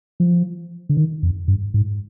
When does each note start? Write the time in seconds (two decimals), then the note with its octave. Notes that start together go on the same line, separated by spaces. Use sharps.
0.20 F3
0.89 D3
0.97 D#3
1.23 F2
1.48 G2
1.74 G#2